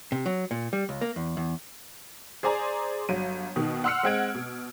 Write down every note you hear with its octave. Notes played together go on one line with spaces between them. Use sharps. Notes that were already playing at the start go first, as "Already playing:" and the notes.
C3
F#3
A#2
G3
C#2
A#3
E2
E2
G#4 C5 D5 G#5 A#5 C6
G1 F#3 D#7
B2 D#3
F#5 C6 E6 F6 C7 C#7
G#3 C4 F#5 E6 G#6 D7
B2